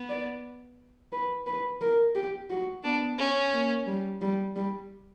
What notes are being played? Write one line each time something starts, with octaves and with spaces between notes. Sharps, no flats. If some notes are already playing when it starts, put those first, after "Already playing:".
Already playing: B3
D5
B4
B4
A#4
G4
F#4
B3 D4
C#4
A#3
G3
G3
G3